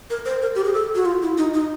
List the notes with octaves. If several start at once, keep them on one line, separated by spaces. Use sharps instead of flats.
A#4
C5
A#4
G4
G#4
A4
F#4
F4
E4
D#4
D#4